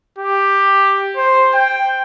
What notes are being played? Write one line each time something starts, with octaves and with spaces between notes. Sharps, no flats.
G4
C5
G5